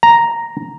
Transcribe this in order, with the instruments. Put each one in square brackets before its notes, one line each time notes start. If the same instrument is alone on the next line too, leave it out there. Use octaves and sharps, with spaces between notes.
[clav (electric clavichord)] A#5